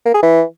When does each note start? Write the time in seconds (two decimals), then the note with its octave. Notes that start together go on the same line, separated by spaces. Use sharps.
0.05 A#3
0.14 G#4
0.23 E3